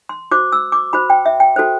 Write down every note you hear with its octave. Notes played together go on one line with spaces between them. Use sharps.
C6
F#4 C5 D6
E6
D6
F#4 C5 B5
G5
E5
G5
F#4 A4 C5